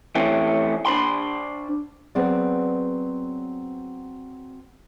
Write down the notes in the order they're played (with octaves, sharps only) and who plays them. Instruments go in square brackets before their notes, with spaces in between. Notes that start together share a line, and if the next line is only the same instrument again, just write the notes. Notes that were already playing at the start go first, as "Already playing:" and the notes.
[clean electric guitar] E3 A3 C4 C#4
D4 C5 B5 C6
[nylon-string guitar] F#3 B3 C4 G#4 D5